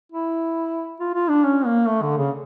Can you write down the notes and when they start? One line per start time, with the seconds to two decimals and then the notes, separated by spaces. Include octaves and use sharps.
0.12 E4
1.00 F4
1.14 F4
1.29 D4
1.44 C#4
1.65 A#3
1.88 A3
2.02 D3
2.17 C#3